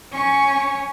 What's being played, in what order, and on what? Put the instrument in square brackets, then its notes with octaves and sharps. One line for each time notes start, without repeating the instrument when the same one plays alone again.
[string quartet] C#4 C#5 G#5 C#6